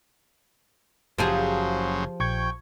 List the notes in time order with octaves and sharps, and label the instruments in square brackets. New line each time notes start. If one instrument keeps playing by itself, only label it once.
[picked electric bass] F#1 [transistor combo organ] C#3 F#3 C5 [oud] F3 G4 G#4
[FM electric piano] A#1 C#6 G#6 [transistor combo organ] G5